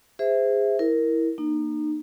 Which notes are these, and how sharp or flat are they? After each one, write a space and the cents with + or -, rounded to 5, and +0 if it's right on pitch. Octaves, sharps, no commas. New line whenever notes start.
G#4 -25 C5 -20 E5 +0
E4 -10 A#4 +0
A#3 +0 D#4 -40